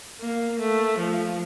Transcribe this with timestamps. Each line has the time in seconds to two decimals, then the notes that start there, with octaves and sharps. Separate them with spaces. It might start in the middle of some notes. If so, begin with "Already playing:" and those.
0.21 A#3
0.60 A3
0.98 F3